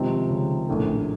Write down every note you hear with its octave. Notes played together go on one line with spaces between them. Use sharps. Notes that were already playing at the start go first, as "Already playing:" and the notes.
Already playing: C#2 C3 D#3 F3 C4 D#4
C#3
A#1 A2 A3